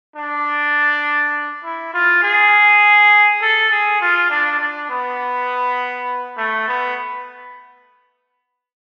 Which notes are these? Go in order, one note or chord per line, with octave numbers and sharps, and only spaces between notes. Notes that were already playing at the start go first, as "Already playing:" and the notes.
D4
E4
F4
G#4
A4
G#4
F4
D4
D4
B3
A3
B3